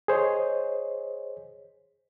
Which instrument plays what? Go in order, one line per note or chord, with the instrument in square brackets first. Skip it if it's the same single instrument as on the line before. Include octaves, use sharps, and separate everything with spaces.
[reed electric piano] G#4 C5 C#5 D#5